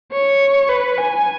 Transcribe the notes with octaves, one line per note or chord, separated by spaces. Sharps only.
C#5
B4
G#5